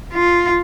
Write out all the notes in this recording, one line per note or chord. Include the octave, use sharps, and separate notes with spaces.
F4